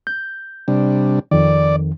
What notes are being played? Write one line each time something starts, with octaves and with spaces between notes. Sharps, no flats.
G6
C3 G3 D4
F2 D#3 D5